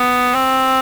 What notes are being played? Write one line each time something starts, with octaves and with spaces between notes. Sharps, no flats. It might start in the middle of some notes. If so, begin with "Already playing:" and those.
Already playing: B3
C4